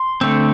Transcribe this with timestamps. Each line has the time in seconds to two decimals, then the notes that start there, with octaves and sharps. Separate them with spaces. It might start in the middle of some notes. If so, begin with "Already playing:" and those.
Already playing: C6
0.21 D3 A3 C4